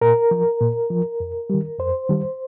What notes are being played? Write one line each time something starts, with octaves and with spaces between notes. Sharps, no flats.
A#2 A#4
F3
A#2
F3
F2
D#3 G3
F2 C5
D#3 G3